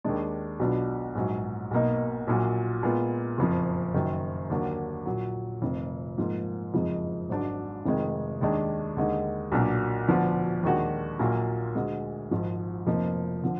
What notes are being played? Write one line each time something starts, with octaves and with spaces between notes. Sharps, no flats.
D#2 D#3 G#3 D4
B1 B2 F#3 D4 F4
A#1 G#2 F#3
B1 B2 A#3 D#4
A#1 A#2 F#3
A#2 G#3 B3 F4
F#1 F2 F3
F#1 F#2 D#3
D#2 D3 F#3 A#3 D4
A#1 A#2 F#3
F1 F2 D#3
G#2 F3 A#3 F4
F#1 F2 F3 G#3 D#4
G#1 G#2 F#3 D4
F1 F2 D#3 G#3
D#2 D#3 G#3 D4
D#2 D3 G#3 D#4
B1 A#2 F#3 A#3 D4
D2 D3 F3 B3 D4
D#2 D#3 G#3 D4 F#4
A#1 A#2 F#3 A#3 F4
D2 D3 G#3
G#1 G#2 F3
F1 F2 F3 A#3 D#4
D3 F3